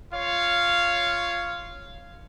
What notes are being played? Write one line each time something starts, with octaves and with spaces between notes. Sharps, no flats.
F4 C#5 F5